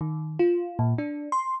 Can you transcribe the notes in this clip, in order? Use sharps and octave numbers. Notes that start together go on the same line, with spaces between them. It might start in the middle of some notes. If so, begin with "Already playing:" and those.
D#3
F4
A#2
D4
C6